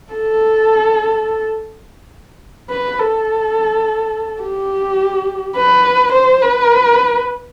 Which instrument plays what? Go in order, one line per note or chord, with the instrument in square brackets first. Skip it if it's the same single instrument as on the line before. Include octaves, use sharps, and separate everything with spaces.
[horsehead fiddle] A4
B4
A4
G4
B4
C5
B4